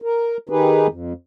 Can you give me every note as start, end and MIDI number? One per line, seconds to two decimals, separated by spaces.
0.02 0.37 70
0.49 0.87 51
0.49 0.87 63
0.49 0.87 67
0.49 0.87 68
0.49 0.87 71
0.89 1.13 41